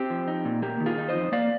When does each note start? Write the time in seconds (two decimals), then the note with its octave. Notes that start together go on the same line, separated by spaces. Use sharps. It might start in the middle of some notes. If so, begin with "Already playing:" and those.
Already playing: C4 G4
0.10 F3
0.28 D#4
0.45 A#2
0.62 A#3 G4
0.80 D#3
0.86 F4 G#4
0.98 D#4
1.08 C5 D#5
1.15 F2
1.32 A#3 D5 F5